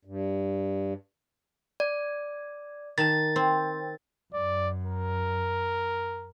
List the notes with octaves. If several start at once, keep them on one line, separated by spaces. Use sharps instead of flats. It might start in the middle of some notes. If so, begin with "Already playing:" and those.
G2
D5
D#3 A5 A6
C4
F#2 D5
A#4